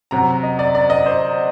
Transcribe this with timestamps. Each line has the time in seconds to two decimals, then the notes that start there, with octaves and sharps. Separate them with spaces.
0.11 C3 F#3 A#5
0.43 D#5
0.59 D5
0.75 D5
0.90 D#5
1.06 C5